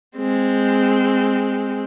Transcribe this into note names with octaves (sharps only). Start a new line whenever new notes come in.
G#3 C4